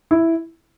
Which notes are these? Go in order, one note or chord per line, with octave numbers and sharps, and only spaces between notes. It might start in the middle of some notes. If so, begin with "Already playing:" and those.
E4